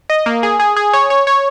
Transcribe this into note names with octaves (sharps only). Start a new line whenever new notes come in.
D#5
A#3
G#4
G#4
G#4
C#5
C#5
C#5